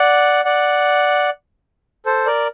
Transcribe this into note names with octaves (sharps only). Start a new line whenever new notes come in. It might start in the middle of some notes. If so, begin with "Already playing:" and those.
Already playing: D5 F#5
D5 F#5
A4 C5
A#4 D5